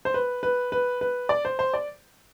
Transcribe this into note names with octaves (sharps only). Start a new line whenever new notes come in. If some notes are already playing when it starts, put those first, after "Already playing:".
C5
B4
B4
B4
B4
D5
C5
C5
D5